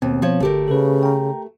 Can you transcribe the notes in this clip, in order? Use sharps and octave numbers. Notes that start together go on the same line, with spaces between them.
D#2 B2 B3 C4
F3 C#5
G1 D3 A3 G4 A#4
C#3 A4 B4
G5 A#5